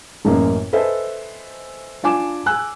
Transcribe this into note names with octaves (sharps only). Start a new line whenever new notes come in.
A1 F#2 A#3
A4 B4 C5 D#5 E5 G#5
D4 F4 G#5 D6 E7
G#5 E6 F#6